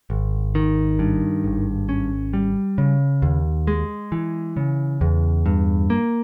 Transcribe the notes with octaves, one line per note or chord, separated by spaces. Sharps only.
G#1
D#3
G2
G#1
C#4
G3
C#3
D#2
G#3
E3
C#3
E2
G2
A#3